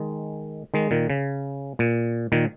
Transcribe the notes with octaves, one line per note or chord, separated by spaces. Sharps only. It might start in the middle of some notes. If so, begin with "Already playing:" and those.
Already playing: D#3 G#3
D#3 G#3
A#2 D#3
C#3
A#2
A#2 D#3